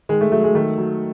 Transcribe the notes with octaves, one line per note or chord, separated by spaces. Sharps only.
D#3 G#3
A3
F#3 A3
G#3
D#3 A3
F#3